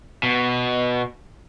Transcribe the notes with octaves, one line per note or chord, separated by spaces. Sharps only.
B2